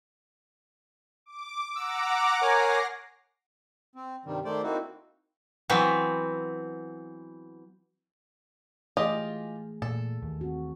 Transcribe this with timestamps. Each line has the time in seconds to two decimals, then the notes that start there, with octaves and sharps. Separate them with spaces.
1.26 D6
1.76 F#5 A#5 D6 E6
2.42 A#4 C#5 G#5 A#6 C7
3.95 C4
4.25 G2 C3 D#3 G3
4.45 D#3 A3 C5 D5
4.63 A#3 C4 D#4 E4 F#4
5.70 E3 F#3 B3 C4
8.97 E3 A3 F4 G4 G#4 D#5
9.82 A#2 A4
10.22 D#2
10.41 C4 F#4